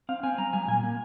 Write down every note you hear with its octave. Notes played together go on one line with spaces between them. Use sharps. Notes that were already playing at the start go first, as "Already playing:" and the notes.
C4 F5
C4 G#5
G3 A#5
G3 G#5
A#2 G#5
A#3